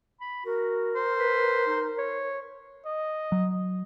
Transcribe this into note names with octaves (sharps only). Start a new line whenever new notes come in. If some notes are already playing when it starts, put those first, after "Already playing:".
B5
F#4 A#4
C5
B4
D#4
C#5
D#5
F#3